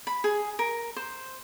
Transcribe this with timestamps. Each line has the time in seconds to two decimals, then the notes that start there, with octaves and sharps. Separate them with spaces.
0.07 B5
0.24 G#4
0.59 A#4
0.96 C5